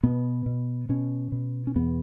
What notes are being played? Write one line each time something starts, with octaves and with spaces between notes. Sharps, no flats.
B2 B3
B2
B2 C#4
B2
C#4
E2 B3